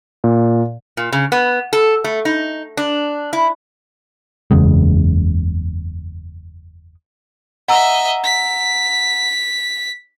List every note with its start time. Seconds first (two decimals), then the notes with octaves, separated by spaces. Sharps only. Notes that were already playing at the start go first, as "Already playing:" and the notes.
0.24 A#2
0.97 A#2
1.12 C#3
1.32 B3
1.73 A4
2.04 A3
2.25 D#4
2.77 D4
3.33 E4
4.51 F#1 E2 C#3 G#3
7.68 D#5 E5 F#5 A#5 E6
8.24 B6